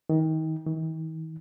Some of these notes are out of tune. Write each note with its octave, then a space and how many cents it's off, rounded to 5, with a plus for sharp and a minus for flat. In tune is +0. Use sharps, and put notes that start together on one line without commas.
D#3 +30
D#3 +45